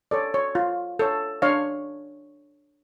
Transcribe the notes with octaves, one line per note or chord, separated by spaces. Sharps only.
A4 C#5 D5
C#5
F4
A4 C#5
D4 C#5 F5